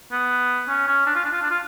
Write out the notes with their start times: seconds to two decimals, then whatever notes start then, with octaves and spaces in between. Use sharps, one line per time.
0.12 B3
0.69 C#4
0.87 C#4
1.07 D4
1.15 F4
1.24 D4
1.33 F4
1.42 D4
1.51 F4